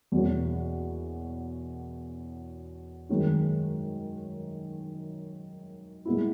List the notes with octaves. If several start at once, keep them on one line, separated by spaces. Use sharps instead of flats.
E2 B2 A#3 C#4 F#4
F#2 D#3 G#3 C#4
A#2 G#3 B3 E4